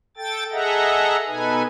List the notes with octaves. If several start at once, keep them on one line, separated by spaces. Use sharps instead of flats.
A4 G5 A6
G#4 A4 D#5 E5 F#5 A#5
B2 D#4 A4 B4 G#5